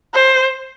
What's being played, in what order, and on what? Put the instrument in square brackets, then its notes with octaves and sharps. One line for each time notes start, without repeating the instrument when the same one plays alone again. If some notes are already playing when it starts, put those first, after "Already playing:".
[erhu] C5